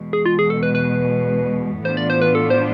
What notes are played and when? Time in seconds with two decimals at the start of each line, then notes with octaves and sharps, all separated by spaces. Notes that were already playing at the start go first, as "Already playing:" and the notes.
Already playing: E2 B2 G#3
0.13 G#4
0.26 F4
0.39 G#4
0.50 A4
0.63 B4
0.75 B4
1.85 A2 E3 B3 D4 F4 C5
1.97 D5
2.10 C5
2.22 B4
2.35 A4
2.50 C5